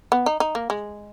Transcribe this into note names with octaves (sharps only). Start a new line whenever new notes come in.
B3
D#4
D#4
A#3
G#3